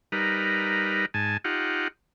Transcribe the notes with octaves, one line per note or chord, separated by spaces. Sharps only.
G3 D#4 A#4 B4
G#2 G#5 A5
D#4 F4 G4 F#5